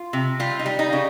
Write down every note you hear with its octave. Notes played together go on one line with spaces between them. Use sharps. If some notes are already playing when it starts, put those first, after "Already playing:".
Already playing: F4
C3
G3 F4
D#4
G3
D#4
C#3